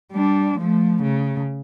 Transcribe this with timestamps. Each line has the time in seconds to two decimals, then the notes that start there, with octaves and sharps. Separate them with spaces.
0.11 G3 D4
0.59 F3 A3
1.02 C#3